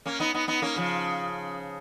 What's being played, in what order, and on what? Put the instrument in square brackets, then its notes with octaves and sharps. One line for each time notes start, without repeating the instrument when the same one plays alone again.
[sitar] A#3 C#4
B3 D#4
B3 D#4
B3 D#4
A#3 C#4
C#3 F3